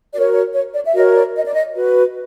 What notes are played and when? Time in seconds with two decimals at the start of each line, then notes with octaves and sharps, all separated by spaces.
0.13 F#4 A#4 C#5 D5
0.33 C#5
0.53 C#5
0.74 D5
0.84 E5
0.94 F#4 A#4 C#5 D#5
1.15 D5
1.35 D#5
1.46 D5
1.54 D#5
1.75 F#4 B4